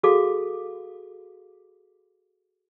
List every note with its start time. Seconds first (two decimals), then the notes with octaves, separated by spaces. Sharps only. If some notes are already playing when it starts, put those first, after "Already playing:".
0.03 F#4 G#4 A4 F5 D6